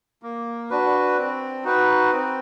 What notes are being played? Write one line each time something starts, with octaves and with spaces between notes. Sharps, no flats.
A#3
D4 F#4 B4
C4
D#4 F#4 B4
C4